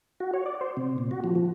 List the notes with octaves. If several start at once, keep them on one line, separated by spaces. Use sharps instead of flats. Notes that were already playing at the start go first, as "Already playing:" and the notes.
F#4
C#5
D5
C5
C3
A#2
F#4
F3
F3